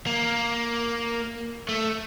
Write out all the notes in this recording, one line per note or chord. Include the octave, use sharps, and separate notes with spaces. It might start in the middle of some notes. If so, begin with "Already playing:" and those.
A#3
A3